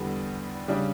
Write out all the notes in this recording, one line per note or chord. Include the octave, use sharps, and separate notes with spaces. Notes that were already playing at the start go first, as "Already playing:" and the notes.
Already playing: E2 D3 G3 B3
C#3 G3 D4